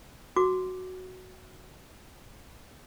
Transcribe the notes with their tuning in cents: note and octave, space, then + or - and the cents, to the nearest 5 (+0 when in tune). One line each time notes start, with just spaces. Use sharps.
F#4 +0 D6 +0